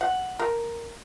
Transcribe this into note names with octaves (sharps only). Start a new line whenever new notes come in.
F#5
A#4